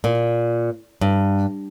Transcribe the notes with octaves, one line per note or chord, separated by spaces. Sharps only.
A#2
G2